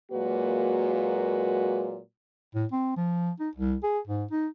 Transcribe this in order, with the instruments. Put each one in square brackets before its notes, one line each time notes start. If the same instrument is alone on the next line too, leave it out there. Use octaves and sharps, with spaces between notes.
[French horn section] A#2 F#3 G#3 A#3 F#4 B4
[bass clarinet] A2
C4
F3
D#4
C2
G#4
G#2
D#4